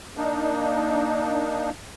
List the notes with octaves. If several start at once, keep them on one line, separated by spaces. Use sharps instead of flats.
A#3 D4 D#4